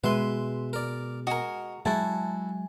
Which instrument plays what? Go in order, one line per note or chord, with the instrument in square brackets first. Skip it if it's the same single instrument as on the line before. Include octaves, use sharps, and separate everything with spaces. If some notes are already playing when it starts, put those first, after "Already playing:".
[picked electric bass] B2 [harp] G#3 D#7 [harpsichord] B4 E5 C6
[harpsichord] A#4 D5
[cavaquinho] F#4 A#4 [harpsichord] D#5 G#5
[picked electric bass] F#3 G#3 [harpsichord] E4 F#4 [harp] G#5 [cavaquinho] A5